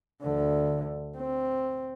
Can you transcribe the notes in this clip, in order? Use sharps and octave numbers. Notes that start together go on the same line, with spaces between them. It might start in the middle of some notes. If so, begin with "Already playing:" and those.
D2 D3
C4